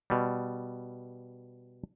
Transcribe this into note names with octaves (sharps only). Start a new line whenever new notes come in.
B2 G3